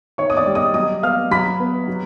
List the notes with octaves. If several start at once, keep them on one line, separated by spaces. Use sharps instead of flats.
D#3 C#5 C#6
D#6
D5 D6
G3
D#5 D#6
F#3 D#5 D#6
B3 F5 F6
F#3 B5 B6
B3
F#3